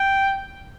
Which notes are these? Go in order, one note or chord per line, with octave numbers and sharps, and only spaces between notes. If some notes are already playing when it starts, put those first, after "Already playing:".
Already playing: G5